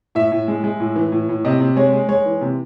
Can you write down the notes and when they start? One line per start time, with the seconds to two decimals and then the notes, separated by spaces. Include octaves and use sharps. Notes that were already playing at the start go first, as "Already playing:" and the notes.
0.15 A2 E5
0.32 A2
0.48 G#3
0.64 G#3
0.80 A2
0.96 E3
1.12 A2
1.29 A2
1.45 C3 D#5
1.61 C3
1.76 G#3 C#5
1.93 G#3
2.09 G#3 C#5
2.26 E3
2.41 C3